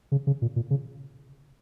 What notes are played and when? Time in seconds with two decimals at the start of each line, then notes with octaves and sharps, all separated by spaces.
0.12 C#3
0.27 C#3
0.42 A#2
0.56 A#2
0.70 C#3